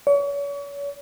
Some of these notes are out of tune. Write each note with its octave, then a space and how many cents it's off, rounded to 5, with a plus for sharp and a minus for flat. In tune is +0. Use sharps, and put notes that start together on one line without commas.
C#5 +40